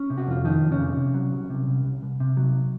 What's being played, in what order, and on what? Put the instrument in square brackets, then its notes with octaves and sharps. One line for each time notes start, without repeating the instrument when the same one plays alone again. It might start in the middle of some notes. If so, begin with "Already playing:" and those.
Already playing: [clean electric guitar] C#4
C3
F#4
F2 F4
D#3 F3 D#4
F2
C#3 C#4
C3
C3
F#3
C2
C3
C2
C2
C2
C3
F#3